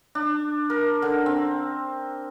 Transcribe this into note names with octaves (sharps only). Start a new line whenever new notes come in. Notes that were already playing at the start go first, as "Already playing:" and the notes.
D4
A#4
D3
C4